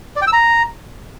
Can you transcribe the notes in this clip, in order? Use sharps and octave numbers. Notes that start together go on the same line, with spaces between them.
D5
G5
E6
A#5